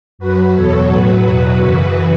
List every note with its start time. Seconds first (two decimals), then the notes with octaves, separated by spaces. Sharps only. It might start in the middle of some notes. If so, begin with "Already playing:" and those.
0.19 F#2 F#3 F#4 B4
0.54 E2 B2 F#3 A4 C#5
0.89 A2 F#3 F#4 B4
1.25 E2 B2 F#3
1.60 F#2 C#3 E3